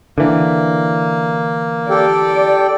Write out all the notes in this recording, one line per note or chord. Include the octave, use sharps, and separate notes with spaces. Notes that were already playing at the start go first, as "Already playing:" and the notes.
D3 E3 A#3
G4 A4 D5 G5